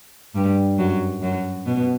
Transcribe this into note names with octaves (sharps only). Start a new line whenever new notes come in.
G2 G3
F#2 F#3
F#2 F#3
B2 B3